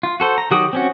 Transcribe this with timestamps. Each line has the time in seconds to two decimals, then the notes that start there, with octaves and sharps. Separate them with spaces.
0.03 F4
0.20 F#4 A4 C5
0.38 A#5
0.51 D#3 F#3 F#4 G4 D#6
0.73 C4 C#4 F#4